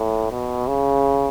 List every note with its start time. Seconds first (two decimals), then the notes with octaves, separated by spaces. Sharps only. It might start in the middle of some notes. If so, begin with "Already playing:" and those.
Already playing: A2
0.31 B2
0.67 C#3